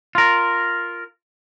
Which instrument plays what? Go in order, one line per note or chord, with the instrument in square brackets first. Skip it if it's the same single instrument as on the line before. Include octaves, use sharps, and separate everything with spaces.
[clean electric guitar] F4 A#4